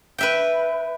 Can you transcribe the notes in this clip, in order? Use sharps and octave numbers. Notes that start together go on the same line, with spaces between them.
B4 E5 G5